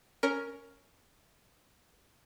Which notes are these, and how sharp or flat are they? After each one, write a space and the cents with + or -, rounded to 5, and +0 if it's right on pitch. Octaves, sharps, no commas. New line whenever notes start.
C#4 +5 A#4 +0